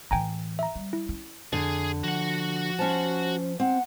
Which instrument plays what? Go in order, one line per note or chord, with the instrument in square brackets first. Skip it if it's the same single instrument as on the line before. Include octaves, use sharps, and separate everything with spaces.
[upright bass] A2 E3 [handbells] G5 G#5 A#5
[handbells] E5 A#5
[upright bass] G3
[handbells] E4
[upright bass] C#4
[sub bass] F2 [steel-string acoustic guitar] D3 [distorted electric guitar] G#4
[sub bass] F3 [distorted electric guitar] F#4 F#5
[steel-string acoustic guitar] C#4 A5 [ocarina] C5
[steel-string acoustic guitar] C4 [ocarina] F#5